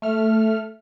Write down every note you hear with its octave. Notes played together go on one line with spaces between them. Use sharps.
A3 F6